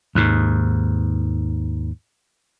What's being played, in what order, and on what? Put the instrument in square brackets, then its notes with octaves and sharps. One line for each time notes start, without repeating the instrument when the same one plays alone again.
[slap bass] D#2 G#2